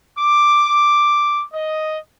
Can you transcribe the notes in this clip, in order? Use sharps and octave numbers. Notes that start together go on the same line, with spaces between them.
D6
D#5